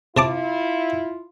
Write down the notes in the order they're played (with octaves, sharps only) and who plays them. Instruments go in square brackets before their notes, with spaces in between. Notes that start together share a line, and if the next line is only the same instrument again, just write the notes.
[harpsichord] C3 A5 D6 [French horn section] E4 F4